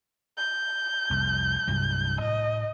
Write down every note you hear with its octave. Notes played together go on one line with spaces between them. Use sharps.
G6
C2 F2
C2 G2 F#3
A2 D#5